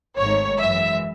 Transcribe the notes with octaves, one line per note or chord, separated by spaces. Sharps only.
G#1 G#2 D#3 A3 C#5
F#2 E3 G#3 E5